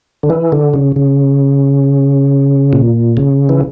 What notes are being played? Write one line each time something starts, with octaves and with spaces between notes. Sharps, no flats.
D3
E3
D3
C#3
C#3
A#2
C#3
E3